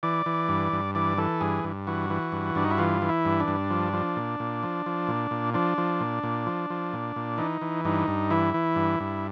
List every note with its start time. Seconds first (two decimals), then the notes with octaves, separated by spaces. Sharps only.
0.03 E3 D5
0.26 E3
0.49 G2
0.73 G2
0.95 E3 D5
1.18 E3 A4
1.41 G2 G#4
1.64 G2
1.87 E3 F#4
2.10 E3
2.32 G2
2.55 G2 D4
2.64 D#4
2.71 E4
2.78 E3 F4
3.02 E3
3.09 E4
3.25 G2
3.40 D4
3.48 G2
3.70 F3
3.93 F3
4.16 A#2
4.40 A#2
4.63 F3
4.86 F3
5.08 A#2
5.31 A#2
5.54 F3 D4
5.78 F3
6.00 A#2
6.23 A#2
6.47 F3
6.70 F3
6.93 A#2
7.16 A#2
7.38 E3 D#4
7.62 E3
7.85 G2 D#4
8.08 G2
8.30 E3 E4
8.54 E3
8.76 G2
9.00 G2